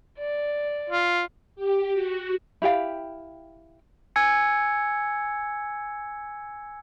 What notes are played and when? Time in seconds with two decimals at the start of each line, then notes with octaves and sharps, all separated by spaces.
0.19 D5
0.90 F4
1.56 G4
1.94 F#4
2.62 E4 G4 F5 G5
4.16 G#5 E6 G#6 C#7